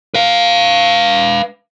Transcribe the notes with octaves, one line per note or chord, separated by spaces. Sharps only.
B4 F5